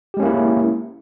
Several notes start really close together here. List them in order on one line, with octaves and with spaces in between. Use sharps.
G4 G#3 C#4 A#3 E4